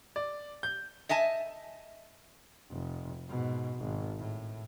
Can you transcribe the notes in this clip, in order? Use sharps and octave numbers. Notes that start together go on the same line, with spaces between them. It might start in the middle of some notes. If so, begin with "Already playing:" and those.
D5
G6
D#5 E5 G#5 A5
F1
G#2 B2
G#1
A2